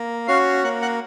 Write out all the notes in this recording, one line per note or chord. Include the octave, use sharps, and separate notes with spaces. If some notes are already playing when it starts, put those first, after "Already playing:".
Already playing: A#3
C#4 F#4 F5
A#3 F#5
F#5